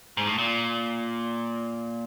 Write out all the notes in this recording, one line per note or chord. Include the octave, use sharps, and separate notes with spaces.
G#2
A2
A#2